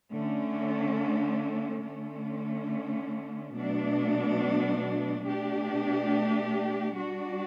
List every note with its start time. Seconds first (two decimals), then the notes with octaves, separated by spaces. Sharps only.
0.12 D3 A3 C#4
1.84 D3 A3 C#4
3.54 B2 F#3 A3 D4
5.25 B2 A3 D4 G4
6.96 G3 D4 F#4